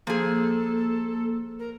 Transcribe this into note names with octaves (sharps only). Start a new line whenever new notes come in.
F3 A#3 G#4 A4
A#4